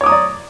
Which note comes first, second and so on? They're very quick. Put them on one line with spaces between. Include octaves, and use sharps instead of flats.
C#5 D6 D#6 A#5 D5